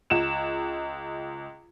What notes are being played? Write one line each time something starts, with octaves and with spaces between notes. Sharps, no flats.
C#2 E7